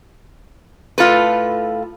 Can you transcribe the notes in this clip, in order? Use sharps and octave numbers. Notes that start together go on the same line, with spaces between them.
A2 F4 A4 B4